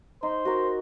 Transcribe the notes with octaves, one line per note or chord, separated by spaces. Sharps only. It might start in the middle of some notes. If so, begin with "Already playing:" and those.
D#4 C5
F#4 A#4